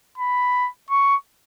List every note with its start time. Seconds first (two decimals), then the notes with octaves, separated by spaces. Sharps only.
0.18 B5
0.90 C#6